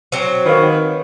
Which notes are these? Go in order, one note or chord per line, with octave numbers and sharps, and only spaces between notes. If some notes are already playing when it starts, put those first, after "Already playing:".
F#3 C4
D#3 B4 C#5 F5